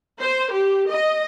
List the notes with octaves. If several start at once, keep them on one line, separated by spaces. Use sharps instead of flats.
C5
G4
D#5